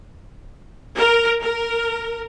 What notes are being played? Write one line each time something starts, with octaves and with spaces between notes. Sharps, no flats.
A#4
A#4